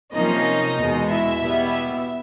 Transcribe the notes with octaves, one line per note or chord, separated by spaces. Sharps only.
C3 F3 A#3 C#4 D#4 D#5
E2 B2 G#3
E4 E5
B2 G3 B3